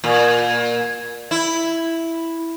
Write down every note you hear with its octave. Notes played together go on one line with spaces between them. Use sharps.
A#2
E4